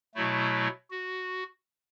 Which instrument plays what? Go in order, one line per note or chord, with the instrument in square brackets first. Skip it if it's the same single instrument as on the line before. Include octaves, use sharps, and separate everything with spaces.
[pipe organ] B2 F#3 A3 E4
F#4